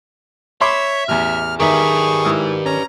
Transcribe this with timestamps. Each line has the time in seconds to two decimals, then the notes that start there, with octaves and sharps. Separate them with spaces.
0.61 C#5 E5 B5 C6 D6
1.08 A1 E2 F6
1.60 D#3 G4 G#4 B4 E5 C#6
2.25 G#2 E4 D#6
2.66 C#4 A#5